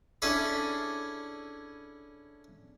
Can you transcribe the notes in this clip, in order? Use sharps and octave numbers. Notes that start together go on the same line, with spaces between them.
C#4 D4 E4 G#4 A4 B5